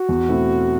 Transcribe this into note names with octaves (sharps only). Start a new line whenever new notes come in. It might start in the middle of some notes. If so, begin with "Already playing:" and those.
Already playing: F#4
E2
B2 A3 C4 E4